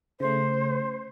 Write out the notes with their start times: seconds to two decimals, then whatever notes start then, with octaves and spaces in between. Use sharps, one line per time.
0.20 C#3 A3 C5